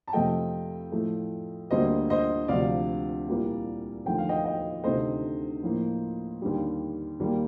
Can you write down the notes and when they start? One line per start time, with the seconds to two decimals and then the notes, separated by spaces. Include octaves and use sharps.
0.08 A5
0.13 F2 C3 F3 A3 D#5 G5
0.92 A2 F3 A3
1.71 D2 D3 G3 A#3 C5 D#5
2.10 C5 D#5
2.48 D2 C3 F3 D5 F5
3.28 C2 A#2 G3 A#3
4.05 D#2 D3 F3 A3 G5
4.18 F5
4.29 D#5 G5
4.45 D#5 G5
4.84 D2 C3 D#3 A3 C5 D#5
5.63 A2 F3 A#3
6.42 D#2 D3 G3
7.20 D#2 D#3 G3 A#3